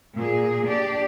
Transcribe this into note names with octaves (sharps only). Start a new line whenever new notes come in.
A#2 G#4
D4 G4 D5